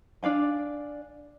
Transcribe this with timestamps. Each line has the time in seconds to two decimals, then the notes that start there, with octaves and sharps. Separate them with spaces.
0.23 D4 D5 F5 G#5